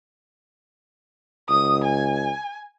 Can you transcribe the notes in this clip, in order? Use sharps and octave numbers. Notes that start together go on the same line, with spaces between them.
C#2 D#6
G#5